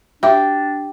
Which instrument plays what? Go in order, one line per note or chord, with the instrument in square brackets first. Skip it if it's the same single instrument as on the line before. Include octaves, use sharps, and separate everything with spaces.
[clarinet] D4 [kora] G4 [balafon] E5